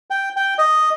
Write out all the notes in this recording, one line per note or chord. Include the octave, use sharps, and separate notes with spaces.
G5
G5
D#5